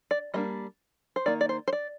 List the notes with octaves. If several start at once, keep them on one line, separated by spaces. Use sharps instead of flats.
D5
G3 A#3 D4 D#5
C5
D#3 A#3 D#4 D5
D5
C5
C5
D5